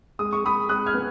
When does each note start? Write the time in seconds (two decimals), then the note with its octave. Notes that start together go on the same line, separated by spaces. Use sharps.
0.19 G#3 D#6
0.33 C#6
0.44 G#3 B5 D#6
0.69 G#3 D#6 F#6
0.86 F6 G#6
0.94 B3